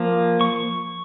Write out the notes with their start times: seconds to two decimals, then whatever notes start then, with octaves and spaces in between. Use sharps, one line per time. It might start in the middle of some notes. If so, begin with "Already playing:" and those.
Already playing: F3 A#3
0.41 C#6